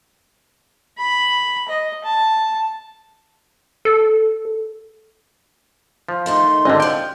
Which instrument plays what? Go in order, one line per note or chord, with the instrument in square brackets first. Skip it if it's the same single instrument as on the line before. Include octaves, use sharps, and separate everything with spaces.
[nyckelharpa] B5
D#5
A5
[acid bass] A4
[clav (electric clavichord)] F3
[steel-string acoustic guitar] D#3 A3 D#4 [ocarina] C6
[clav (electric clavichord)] G#1 D3 [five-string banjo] C#4 D#5
[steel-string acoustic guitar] F3 G4 [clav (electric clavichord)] G5